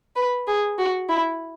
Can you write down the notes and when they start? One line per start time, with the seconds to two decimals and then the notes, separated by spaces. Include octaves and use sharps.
0.16 B4
0.47 G#4
0.78 F#4
1.09 E4